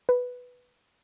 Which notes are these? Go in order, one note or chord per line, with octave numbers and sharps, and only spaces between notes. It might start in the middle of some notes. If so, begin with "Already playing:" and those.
B4